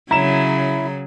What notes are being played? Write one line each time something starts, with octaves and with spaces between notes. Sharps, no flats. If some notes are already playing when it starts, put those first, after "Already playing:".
C#3 F#3 E4 A#5 E7